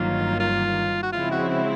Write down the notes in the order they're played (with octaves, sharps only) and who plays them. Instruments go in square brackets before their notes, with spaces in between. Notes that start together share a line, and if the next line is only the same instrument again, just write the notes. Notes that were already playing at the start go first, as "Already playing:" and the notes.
Already playing: [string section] G1 G2 D#3 F#3 A#3 [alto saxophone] F4
[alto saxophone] F4
F#4
[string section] C#3 F3 G#3 C4 E4 [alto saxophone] F4
[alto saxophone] F#4
F#4